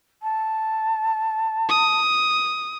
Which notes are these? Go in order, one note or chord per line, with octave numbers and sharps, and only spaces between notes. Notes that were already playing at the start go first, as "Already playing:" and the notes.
A5
D#6